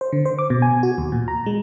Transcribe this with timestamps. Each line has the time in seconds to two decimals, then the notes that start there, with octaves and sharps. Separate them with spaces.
0.01 C5
0.12 D3
0.26 C5
0.39 D6
0.50 B2
0.62 G#5
0.83 F#4
0.98 D#2
1.12 A#2
1.28 A#5
1.46 G#3